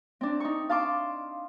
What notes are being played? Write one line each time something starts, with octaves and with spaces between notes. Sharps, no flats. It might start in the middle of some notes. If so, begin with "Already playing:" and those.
C4 D4
D#4 C#6
F5 A5 C6 D6